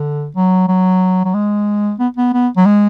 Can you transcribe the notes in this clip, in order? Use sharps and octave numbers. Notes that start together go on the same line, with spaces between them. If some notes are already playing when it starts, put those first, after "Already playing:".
Already playing: D3
F#3
F#3
F#3
G#3
B3
B3
B3
F#3
G#3